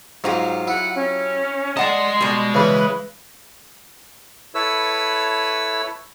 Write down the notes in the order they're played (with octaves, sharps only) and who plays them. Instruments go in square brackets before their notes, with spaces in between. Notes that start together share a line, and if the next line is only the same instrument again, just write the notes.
[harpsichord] G#2 [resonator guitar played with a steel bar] F#3 F4 G4
[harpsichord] E4 [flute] F#5
[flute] C#4
[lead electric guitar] G#3 D#5 [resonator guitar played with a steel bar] D5 F#5 A5 [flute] C6
[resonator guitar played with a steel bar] B2 G3
[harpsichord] C#3 E3 [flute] B4
[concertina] E4 A4 B4 C#5 E6